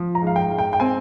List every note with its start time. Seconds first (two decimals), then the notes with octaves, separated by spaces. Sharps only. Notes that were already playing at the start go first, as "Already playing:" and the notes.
Already playing: F3
0.15 A#5
0.22 G#2 F5
0.36 G5
0.51 G#2
0.58 G5
0.73 G5
0.80 C4 G#5